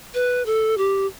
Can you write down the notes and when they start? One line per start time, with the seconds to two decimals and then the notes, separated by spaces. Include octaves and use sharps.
0.14 B4
0.46 A4
0.78 G4